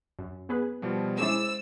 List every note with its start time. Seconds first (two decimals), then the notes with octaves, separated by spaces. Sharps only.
0.19 F#2
0.49 B3 G#4 B4
0.82 B2 F3 G3
1.19 G#3 C#4 E4 C5 D6 E6 A6